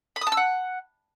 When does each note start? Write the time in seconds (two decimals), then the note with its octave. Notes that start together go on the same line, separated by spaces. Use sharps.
0.16 B5
0.21 D#6
0.27 A5
0.32 E6
0.37 F#5